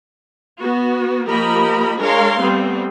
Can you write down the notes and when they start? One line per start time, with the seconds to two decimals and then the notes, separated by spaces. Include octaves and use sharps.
0.59 B3 F#4
1.27 F3 A#3 G4 A#4 D#5 B5
1.99 G#3 D4 A#4 C#5 F5 C6
2.40 G3 A3 B3 C4